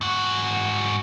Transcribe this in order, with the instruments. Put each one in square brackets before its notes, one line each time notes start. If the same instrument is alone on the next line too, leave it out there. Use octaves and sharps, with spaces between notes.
[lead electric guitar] G#2 F#4